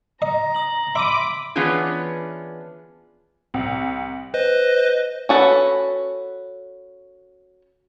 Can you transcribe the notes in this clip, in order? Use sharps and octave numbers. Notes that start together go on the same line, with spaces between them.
D#5 A#5
D#6 F#7
E5 B5 C6 D6 E6 D#7
E3 B3 C#4 D4 F4 G#4
C2
B4 C5 D#5
C#4 F#4 A4 B4